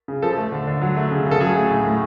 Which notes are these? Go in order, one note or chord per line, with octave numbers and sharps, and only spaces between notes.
C#3
F3 A4
A3
D3
D3
F#3
A3
C#3
C#3
A4
F#3 G#4
A3
A2
A2